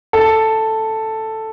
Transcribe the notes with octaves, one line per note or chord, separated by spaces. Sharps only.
A4